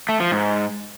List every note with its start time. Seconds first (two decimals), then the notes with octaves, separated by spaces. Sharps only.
0.09 A3
0.20 F3
0.31 G#2